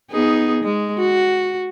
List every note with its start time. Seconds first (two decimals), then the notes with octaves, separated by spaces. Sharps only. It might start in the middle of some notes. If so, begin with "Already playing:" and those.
0.12 B3 D#4 G#4
0.64 G#3
0.99 F#4